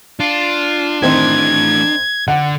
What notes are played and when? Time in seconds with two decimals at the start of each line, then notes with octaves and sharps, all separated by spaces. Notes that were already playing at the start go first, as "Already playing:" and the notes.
0.20 D4 F4
1.02 D#3 E3 A3 C4 G#6
2.28 D3 F#5